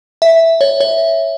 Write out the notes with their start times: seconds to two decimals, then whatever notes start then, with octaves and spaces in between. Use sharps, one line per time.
0.22 E5
0.61 C#5
0.80 C#5